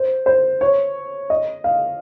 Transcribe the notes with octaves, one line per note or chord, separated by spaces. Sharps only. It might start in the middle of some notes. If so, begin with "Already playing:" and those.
Already playing: C5
C5
C#5
D#5
F5